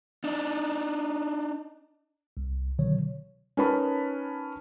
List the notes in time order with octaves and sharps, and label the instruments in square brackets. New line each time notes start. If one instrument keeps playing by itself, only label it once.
[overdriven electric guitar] D4 D#4
[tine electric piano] C2
B2 D3 D#3 F#3 C#5
[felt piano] C#4 D#4 A#4 B4 A5 B5